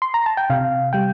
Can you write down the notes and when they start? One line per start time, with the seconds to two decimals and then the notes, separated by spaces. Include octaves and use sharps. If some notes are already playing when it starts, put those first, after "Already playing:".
0.02 C6
0.14 A#5
0.26 A5
0.37 G5
0.50 C3 F5
0.93 G3 G5